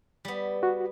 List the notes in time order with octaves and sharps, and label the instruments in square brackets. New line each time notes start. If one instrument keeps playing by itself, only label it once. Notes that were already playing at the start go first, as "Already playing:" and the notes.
[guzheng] G3 B3
[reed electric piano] F#4